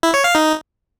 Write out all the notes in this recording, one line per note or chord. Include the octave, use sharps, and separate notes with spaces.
E4
C#5
F5
D#4